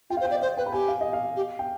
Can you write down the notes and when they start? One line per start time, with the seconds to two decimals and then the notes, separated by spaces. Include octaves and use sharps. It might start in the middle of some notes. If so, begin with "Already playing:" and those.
0.10 F4 G5
0.17 F5
0.21 C5
0.25 G5
0.31 D5
0.34 D#5
0.42 C5 F5
0.57 B4 G5
0.66 B5
0.72 G4 G#5
0.88 F5
1.01 D#5
1.13 F5
1.36 G4
1.59 G5